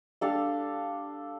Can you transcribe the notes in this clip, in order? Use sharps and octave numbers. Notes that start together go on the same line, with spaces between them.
G3 D4 A4 F5